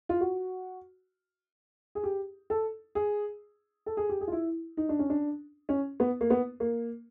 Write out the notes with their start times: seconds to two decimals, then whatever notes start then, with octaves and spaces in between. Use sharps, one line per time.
0.09 F4
0.21 F#4
1.95 G#4
2.04 G4
2.50 A4
2.95 G#4
3.86 A4
3.97 G#4
4.09 G4
4.21 G#4
4.28 F4
4.32 E4
4.77 D#4
4.89 D4
4.99 C#4
5.10 D4
5.69 C#4
6.00 B3
6.21 A#3
6.30 B3
6.60 A#3